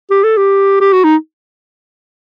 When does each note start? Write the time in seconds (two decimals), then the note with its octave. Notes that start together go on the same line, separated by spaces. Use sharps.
0.11 G4
0.24 A4
0.37 G4
0.81 G4
0.93 F#4
1.04 D#4